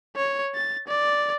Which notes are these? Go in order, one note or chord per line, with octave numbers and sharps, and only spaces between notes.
C#5
A6
D5